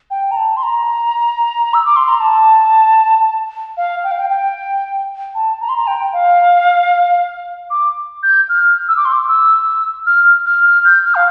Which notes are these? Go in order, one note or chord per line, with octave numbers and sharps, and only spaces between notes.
G5
A#5
A5
C6
A#5
E6
D6
C6
A#5
A5
F5
G5
F5
G5
G5
A5
A#5
C6
A#5
G5
F5
D6
G6
F6
E6
D6
C6
D6
E6
F6
F6
F6
G6
F6
F5